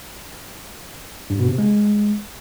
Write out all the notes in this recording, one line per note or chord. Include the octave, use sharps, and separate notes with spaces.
G2
B2
C3
G#3